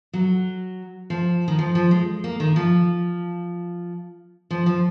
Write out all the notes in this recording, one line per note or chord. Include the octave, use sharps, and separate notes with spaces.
F#3
F3
D#3
F3
F3
G#3
A#3
D#3
F3
F3
F3